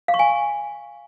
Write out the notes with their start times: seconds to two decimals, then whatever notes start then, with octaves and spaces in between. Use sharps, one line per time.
0.08 F5
0.14 C#6
0.19 G#5